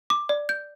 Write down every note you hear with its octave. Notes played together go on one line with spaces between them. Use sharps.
D6
D5
G6